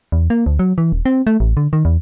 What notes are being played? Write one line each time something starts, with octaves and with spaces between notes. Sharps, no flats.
E2
A#3
D2
F#3
E3
D#1
C4
A3
A1
D3
D#3
E2